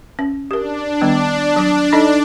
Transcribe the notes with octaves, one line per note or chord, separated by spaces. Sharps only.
C#4
D4 G4 A#4
D#3 G3 B3
F#3 D6
D#4 A4 D#5